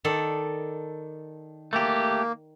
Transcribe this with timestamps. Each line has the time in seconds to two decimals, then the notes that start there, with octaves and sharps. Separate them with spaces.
0.04 D#3 A4 D5
1.73 A3 A#3 G4